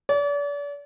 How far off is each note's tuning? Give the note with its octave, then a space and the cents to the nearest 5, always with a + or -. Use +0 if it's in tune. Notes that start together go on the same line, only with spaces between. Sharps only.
D5 -40